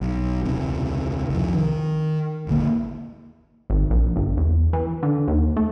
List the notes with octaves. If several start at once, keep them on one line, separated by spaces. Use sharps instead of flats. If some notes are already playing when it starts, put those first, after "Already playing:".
B1
E1 C#2 C3
C2 F2
D#3
D#1 G#1 D3 A#3
G#1
A#1
G1
E2
E3
D3
D#2
A3